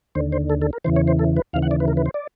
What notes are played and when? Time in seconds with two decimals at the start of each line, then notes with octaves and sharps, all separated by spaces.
0.15 D#2 D3 C5
0.32 C5
0.50 A4
0.62 A4
0.73 A#4
0.84 E2 C#3 E3 C5
0.96 C#5
1.07 C5
1.19 A4
1.37 B4
1.53 D#2 C#3 E3 F5
1.62 F#5
1.71 D5
1.80 B4
1.88 A#4
1.97 B4
2.06 C5
2.14 D5